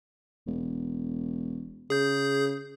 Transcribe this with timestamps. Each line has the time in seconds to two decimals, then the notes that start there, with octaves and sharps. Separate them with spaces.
0.47 E1
1.90 C#3 G#4 G6